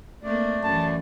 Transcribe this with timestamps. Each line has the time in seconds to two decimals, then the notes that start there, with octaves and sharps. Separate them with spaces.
0.23 A3 A#3 C4 D4 D5
0.63 F#2 E3 A5